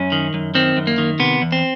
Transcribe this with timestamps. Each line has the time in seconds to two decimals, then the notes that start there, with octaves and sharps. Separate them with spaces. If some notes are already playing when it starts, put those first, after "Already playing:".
Already playing: F#2 C#4
0.12 D#3
0.34 F#2
0.55 D#3 C4
0.77 F#2
0.87 A#3
0.98 D#3
1.20 C3 B3
1.42 E2
1.52 C4